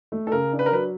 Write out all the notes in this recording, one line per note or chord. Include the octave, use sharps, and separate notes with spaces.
A3
A4
C#3 A#4
D4
B4
A#4
F#3 B4